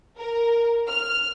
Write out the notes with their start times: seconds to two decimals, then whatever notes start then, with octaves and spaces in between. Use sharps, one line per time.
0.16 A#4
0.89 F6